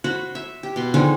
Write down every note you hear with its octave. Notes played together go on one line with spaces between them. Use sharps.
F#4 C5 B5
E5
G4
B2 C6
D3 D#3 F3 G#3